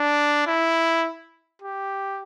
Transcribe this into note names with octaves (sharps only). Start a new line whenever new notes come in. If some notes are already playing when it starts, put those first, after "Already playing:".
Already playing: D4
E4
G4